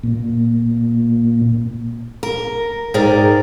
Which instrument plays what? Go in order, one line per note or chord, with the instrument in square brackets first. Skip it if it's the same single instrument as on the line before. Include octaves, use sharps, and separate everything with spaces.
[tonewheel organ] A#2
[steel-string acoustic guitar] A#4
G#2 G#4 A#4 D5 G5 A#5